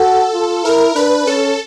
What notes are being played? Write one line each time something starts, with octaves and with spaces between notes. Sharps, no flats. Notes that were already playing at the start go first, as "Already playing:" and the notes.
Already playing: F#4 A4
F4
E4 A#4
D4 B4
C#4 A4